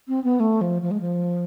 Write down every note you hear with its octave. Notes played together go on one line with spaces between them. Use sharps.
C4
B3
A3
F3
F3
G#3
F3